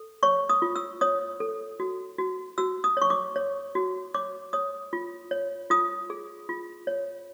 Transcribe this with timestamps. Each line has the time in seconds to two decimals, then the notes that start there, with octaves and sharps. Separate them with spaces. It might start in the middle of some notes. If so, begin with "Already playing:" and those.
Already playing: A4
0.23 C#5 C#6
0.49 D#6
0.62 F4
0.76 E6
1.01 C#5 D#6
1.40 A4
1.80 F#4
2.18 F#4
2.58 F#4 E6
2.84 D#6
2.97 C#5 C#6
3.10 D6
3.36 C#5
3.75 F#4
4.14 C#5 D6
4.53 C#5 D#6
4.93 F4
5.31 C#5
5.70 F4 D#6
6.10 G#4
6.49 F4
6.87 C#5